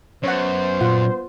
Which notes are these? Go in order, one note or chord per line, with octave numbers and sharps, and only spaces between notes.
F#2 B3 C5 C#5 F#5
A#2 F4 F#5